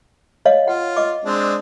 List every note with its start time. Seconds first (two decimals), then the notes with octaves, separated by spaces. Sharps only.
0.45 C#5 D#5 F5
0.68 F4 F#5
0.96 D#5 D6
1.25 G#3 C4 D4